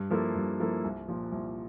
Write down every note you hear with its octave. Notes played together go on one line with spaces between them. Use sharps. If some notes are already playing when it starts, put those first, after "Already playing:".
Already playing: G2
F3 A#3 E4 A4
G2
F3 A#3 E4 A4
C2
A#2 F3
C2